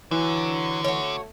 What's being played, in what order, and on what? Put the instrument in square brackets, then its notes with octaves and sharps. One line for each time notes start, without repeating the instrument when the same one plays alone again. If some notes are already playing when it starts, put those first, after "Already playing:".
[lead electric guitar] D3 [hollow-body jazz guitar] E3 [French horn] F#3
[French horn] A3 [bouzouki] F#4 C#5